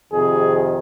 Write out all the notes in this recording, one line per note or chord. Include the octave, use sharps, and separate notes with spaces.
F2 C3 D#3 G#4